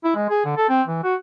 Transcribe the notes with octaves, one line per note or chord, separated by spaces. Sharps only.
E4
G#3
G#4
D3
A4
C4
E3
F#4